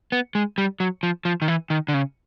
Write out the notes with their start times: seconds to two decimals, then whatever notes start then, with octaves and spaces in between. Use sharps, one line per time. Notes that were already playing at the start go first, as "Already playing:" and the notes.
0.12 B3
0.35 G#3
0.58 G3
0.80 F#3
1.03 F3
1.25 F3
1.42 D#3
1.48 E3
1.70 D#3
1.88 D3
1.94 C#3